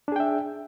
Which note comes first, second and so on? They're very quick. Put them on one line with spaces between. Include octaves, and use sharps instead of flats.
D4 G#4 G5 E5